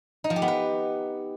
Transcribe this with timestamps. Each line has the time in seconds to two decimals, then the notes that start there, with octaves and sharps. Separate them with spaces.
0.24 D#4
0.30 F3
0.36 G4
0.42 B3
0.48 B4